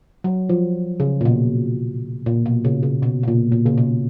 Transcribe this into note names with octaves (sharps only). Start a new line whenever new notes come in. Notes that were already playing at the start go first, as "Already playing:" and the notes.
F#3
F3
C#3
A#2
B2
A#2
B2
C#3
C#3
B2
B2
A#2
A#2
C#3
B2